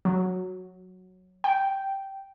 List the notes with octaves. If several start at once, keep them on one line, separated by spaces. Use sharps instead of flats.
F#3
G5